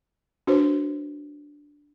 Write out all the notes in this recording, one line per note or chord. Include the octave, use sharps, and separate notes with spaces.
D4 F#4 B4 C5